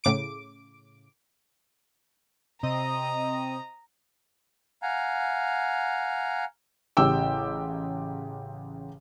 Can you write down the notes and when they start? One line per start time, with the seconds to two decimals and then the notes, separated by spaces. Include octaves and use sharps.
0.04 A2 C#3 D6 D7
2.63 C3 C4 D#5 A#5 D#6
4.82 F5 F#5 G#5 A#5
6.97 A1 C#3 G4 G5 E6